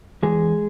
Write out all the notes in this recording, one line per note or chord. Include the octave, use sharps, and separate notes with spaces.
E2 G#3 G#4